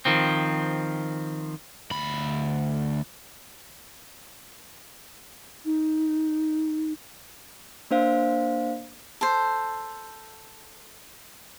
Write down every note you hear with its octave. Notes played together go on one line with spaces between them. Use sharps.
D#3 F3 C4
D2 B5
D#4
A#3 D4 C5 F5
A4 C5